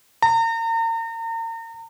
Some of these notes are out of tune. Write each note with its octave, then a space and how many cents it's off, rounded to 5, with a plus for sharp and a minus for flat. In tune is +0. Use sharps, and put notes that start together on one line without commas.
A#5 -40